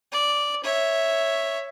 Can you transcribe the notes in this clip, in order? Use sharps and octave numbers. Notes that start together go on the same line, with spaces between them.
D5
C#5 E5